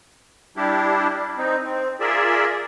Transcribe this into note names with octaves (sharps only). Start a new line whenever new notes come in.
G3 D4 E4 G4
C4 D#4
C4
F4 G#4 A#4 D5 E5